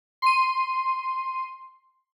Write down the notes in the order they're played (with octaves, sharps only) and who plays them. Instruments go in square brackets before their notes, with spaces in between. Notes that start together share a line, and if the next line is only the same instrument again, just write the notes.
[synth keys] C6 D#7